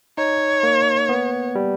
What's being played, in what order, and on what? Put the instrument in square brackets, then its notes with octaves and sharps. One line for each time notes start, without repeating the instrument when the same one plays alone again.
[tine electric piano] D#4 [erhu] C#5
[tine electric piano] A#3
B3
G3